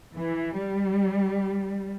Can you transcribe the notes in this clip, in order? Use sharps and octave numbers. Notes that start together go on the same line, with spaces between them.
E3
G3